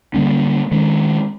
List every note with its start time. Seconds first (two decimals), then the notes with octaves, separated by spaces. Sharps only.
0.14 D3 G3 A#3 C#4
0.71 D#3 G#3 C#4